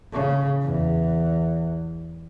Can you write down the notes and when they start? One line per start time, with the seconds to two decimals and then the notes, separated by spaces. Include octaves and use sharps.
0.12 C#3
0.62 E2